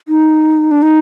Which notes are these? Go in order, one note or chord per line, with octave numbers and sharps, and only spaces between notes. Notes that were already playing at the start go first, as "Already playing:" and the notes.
D#4
D4
D#4